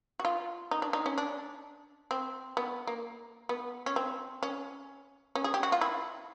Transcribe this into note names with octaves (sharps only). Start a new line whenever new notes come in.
F#4
F4
D#4
D4
D#4
C#4
D4
C4
B3
A#3
B3
C#4
C4
C#4
C#4
G#4
G4
F#4
F4
E4